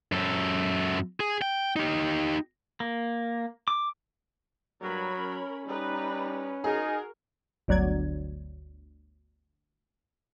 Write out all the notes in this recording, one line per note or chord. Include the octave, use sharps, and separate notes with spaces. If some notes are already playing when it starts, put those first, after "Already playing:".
F#2 A4
G#4
G5
D#4 G4
A#3
D6
G2 F#3 A#4 C#5 B5
C#4
G3 D#4 B4 A#5
D#4 F#4 G#4 A#4
G1 D2 F#3 D5 G#6